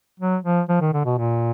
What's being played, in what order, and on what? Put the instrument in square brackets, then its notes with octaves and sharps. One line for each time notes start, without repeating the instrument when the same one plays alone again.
[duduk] F#3
F3
F3
D#3
D3
B2
A#2